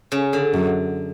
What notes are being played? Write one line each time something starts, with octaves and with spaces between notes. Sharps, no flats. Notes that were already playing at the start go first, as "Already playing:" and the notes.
C#3
D3
F#2